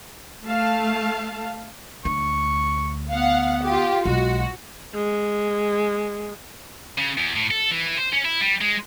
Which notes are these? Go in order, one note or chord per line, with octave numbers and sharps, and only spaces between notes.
A3 F5 A5
D2 C#6
B3 F5 F#5
F4 G4
B1 G#3 F#4
G#3
C#3
E2
A2
A4
E3
C5
C#4
E4
G3
G#3